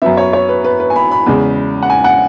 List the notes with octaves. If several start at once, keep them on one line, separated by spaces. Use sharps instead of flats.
F#2 F#3 B3 E5
C#5
C#5
B4
B4
B4
G#5
B5
B5
E2 C#3 G#3
F#5
G#5
F#5